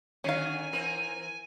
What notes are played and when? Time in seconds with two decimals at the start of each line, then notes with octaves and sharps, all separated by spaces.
0.24 D3 D#3 F#3 C#4 F5 G#5
0.72 E3 C4 A#4 D#7